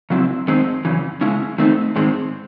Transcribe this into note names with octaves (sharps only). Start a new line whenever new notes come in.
C#3 F#3 C4 E4
F#2 D#3 G#3 C4 D#4
F#2 C#3 E3
C#3 G#3 C#4 E4
D#3 A3 C4 D#4
G#2 D#3 G#3 C4